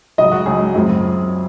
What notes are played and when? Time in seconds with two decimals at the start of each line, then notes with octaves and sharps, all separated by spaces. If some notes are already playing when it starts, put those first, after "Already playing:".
0.18 C#2 C#3 F#3 D#5
0.32 F#4
0.46 C#2 C#3 F#3 G#4
0.75 F#2 C#3 F3 C4